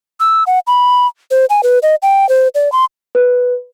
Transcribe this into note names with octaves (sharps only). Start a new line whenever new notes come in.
E6
F#5
B5
C5
G#5
B4
D#5
G5
C5
D5
C6
B4